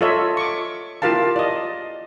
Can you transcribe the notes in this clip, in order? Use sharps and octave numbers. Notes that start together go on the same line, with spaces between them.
F4 A4 C#5 D#5 E5
C#6 D6
E4 F4 G4 A#4 F5 A5
D5 D#5